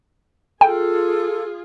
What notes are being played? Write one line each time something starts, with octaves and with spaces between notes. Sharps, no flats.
F4 G#4 A4 G5